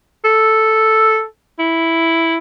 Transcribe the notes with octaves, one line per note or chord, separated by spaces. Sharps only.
A4
E4